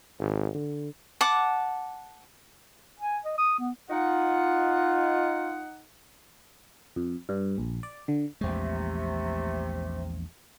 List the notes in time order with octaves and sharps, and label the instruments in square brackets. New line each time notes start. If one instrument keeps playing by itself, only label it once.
[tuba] G#1
D3
[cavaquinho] F#5 A5 D6
[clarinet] G#5
D#5
D#6
B3
[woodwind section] D#4 F#5 [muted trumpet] F4
[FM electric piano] F2
G2
A#1
D5
D3
[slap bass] A#1 E2 G#3 [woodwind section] C3 A3